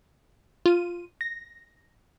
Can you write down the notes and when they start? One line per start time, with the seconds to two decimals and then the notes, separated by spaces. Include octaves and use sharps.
0.66 F4 D#7
1.21 A#6